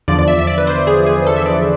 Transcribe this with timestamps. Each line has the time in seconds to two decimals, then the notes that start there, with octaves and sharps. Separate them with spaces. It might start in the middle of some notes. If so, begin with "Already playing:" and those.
0.08 E2 D3 F3 D5
0.19 D5
0.28 E5
0.39 E5
0.47 D5
0.58 B4
0.67 C5
0.87 G#4
1.06 G#4
1.27 A4
1.37 E5
1.46 D5